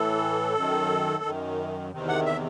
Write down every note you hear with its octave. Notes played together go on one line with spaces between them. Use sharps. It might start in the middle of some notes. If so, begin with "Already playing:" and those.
Already playing: A2 E3 A4
F#2 D#3
F#2 D#3
E2 C3 D#3
F#5
E5